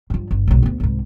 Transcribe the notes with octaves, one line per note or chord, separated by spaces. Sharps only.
G2 F3
G1
B1 G#2
D2 B3
C2 G#2